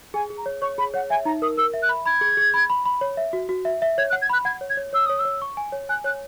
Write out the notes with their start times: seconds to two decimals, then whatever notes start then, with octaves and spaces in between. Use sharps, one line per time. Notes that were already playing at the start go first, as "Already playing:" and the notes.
0.14 G#4 G#5
0.30 G#4
0.37 A#5
0.46 C#5
0.61 C#5 C#6
0.78 G#4 B5
0.94 C#5 F#5
1.10 E5 G#5
1.25 D#4 A#5
1.42 A#4 D#6
1.57 A#4 E6
1.74 E5
1.82 F#6
1.89 B5
2.06 B5 G#6
2.21 G#4
2.37 G#4
2.54 B5
2.70 B5
2.86 B5
3.01 C#5
3.17 E5
3.33 F#4
3.49 F#4
3.65 E5
3.82 E5
3.98 C#5 G#6
4.10 F#6
4.13 F#5
4.21 G#6
4.29 B5 F#6
4.45 F#5 G#6
4.61 C#5
4.70 G#6
4.77 C#5
4.93 C#5 E6
5.06 C#5 D#6
5.19 E6
5.25 C#5
5.42 C#6
5.57 G#5
5.72 C#5
5.89 G#5 F#6
6.04 C#5 F#6